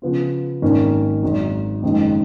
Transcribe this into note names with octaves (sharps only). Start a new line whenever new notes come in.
C#3 F3 B3 F4
G#1 G#2 D#3 A#3 C#4
G#1 G#2 F#3
F#1 F2 D#3 G#3